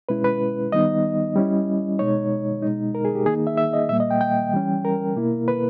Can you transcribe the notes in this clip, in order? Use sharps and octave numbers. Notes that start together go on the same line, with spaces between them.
B2 G#3 C#4 E4 B4
B4
D#3 G3 B3 D#4 D#5
G3 C#4 E4
B2 G#3 D#4 C#5
B2 G#3 D#4
A#4
G#4
G4
D#3 A#3 D#4 G#4
E5
E5
D#5
A#2 G3 A#3 E5
D#5
G5
G5
E3 G3 C#4
A#4
B2 A#3 E4
B4